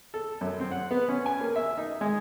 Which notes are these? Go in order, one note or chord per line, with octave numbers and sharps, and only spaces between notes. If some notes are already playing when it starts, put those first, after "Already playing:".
A4
F#2
C4
F#5
B3
C#4
G#5
A#3
E5
D#4
G#3